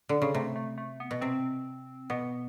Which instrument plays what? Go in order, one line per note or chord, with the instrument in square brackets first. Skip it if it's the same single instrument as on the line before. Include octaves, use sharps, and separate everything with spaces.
[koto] D3
C#3
[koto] C3 [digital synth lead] A3
[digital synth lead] A3
A3
B3
[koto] B2
[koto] C3 [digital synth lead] C4
[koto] B2 [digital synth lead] B3